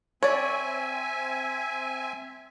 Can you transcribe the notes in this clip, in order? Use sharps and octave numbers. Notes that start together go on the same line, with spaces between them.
C4 C#5 D5 E5 G#5